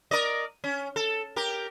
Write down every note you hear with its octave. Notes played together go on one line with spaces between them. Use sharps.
A#4 D5 D#5
C#4
A4
G4 A#4